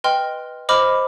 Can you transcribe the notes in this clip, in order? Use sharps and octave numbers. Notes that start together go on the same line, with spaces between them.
B4 D#5 G5 C6 F6
C5 D#5 B5 D6 F6